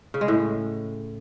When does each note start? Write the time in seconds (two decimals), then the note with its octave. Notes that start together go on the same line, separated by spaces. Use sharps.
0.14 C#3
0.21 G#3
0.28 A2